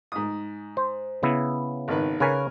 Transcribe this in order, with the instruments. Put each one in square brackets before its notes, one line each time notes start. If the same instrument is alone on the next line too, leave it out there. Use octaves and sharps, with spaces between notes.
[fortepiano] G#2 D#6
[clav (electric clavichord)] C5
C#3 B3 E4
[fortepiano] G#1 D#3 B4
[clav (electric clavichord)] C#3 B4 C#5 [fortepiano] A#4 G#5